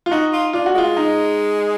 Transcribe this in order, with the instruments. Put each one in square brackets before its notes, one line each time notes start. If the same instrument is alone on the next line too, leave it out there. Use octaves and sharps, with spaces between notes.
[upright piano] F4
[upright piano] D#4 [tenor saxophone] F#4
[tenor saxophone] F4
[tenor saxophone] D4 [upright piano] F4
[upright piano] F#4
[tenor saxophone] G#3 [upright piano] F4
[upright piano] D#4